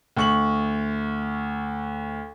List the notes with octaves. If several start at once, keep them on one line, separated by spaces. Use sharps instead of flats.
D2 C#6 F#7